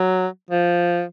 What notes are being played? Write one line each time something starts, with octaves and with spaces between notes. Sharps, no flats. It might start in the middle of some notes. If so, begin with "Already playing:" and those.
Already playing: F#3
F3